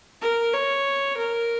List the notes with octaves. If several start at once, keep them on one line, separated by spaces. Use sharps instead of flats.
A#4
C#5
A#4